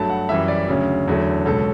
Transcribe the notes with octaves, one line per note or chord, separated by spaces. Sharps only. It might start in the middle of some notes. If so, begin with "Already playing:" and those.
Already playing: G2 F#3 A3 A5
F#5
F#2 E3 G3 E5
D5
D2 C#3 F#3
E2 D3 F#3 A3
C#2 B2 F#3 A4